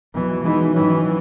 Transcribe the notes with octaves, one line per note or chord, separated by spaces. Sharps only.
E2 B2 E3 F#3
E3 G#3 D#4 F#4 B4
G#2 D#3 E3 F#3 C#4
F#3